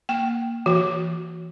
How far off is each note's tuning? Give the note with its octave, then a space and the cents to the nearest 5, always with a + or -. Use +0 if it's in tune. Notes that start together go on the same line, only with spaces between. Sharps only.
A#3 +0 G5 +0
E3 +25 F#4 -5